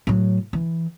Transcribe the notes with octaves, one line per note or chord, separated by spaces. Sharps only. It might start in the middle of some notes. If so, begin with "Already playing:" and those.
A2 F#3
E3